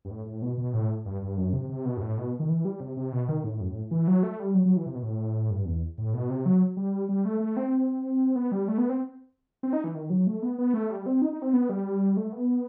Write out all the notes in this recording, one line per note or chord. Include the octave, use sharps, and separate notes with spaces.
G2
A2
A2
B2
B2
A2
G2
G2
F#2
C3
C3
B2
G2
A2
B2
D#3
E3
G3
C3
C3
B2
D#3
A2
F#2
A2
E3
F#3
A3
G3
F#3
F#3
E3
C3
B2
A2
G2
E2
A2
B2
C3
F#3
G3
G3
A3
A3
C4
B3
G3
A3
B3
C4
C4
D#4
E3
D#3
F#3
A3
B3
B3
A3
G3
C4
D#4
D#4
C4
B3
G3
A3
B3